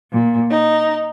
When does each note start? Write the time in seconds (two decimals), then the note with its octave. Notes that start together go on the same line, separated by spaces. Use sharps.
0.12 A#2
0.50 D#4